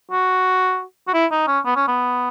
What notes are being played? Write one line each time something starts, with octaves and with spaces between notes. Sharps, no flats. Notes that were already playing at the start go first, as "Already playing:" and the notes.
F#4
F#4
E4
D#4
C#4
B3
C#4
B3